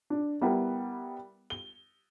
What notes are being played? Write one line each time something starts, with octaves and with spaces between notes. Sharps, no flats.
D4
G3 B3 E4 A#4
G7